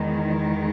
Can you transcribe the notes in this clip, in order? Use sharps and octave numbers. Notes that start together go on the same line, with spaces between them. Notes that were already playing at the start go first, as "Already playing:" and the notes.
Already playing: E2 D#3 G#3